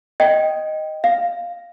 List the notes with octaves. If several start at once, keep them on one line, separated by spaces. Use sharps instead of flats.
D#5 G5
F5